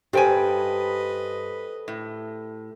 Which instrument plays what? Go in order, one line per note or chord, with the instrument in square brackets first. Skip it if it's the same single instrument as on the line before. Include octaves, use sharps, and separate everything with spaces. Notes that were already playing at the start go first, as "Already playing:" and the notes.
[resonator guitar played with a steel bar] G2 G5 G#5 [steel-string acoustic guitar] G4 A4 C5 [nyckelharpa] B4 D#5
[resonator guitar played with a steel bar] A2